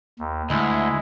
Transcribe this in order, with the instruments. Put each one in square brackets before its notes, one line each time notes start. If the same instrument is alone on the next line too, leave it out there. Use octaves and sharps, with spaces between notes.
[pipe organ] D#2
[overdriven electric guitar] D2 [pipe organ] G#3 E4